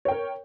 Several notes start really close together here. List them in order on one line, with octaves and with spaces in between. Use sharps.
C#5 G5 A#4